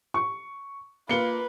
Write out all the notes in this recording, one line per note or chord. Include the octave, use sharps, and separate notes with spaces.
C#6
A#3 F4 B4 C#7 G7